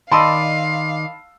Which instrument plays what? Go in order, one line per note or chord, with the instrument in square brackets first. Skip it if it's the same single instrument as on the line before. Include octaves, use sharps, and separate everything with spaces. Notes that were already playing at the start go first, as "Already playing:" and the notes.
[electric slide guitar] D#3 D5 D#5 [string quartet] F5 [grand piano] A5 B5 E6 [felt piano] C6